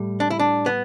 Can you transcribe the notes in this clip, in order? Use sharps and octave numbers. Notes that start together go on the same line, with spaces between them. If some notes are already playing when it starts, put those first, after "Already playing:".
Already playing: A2 G3
D4
E4
D4
B3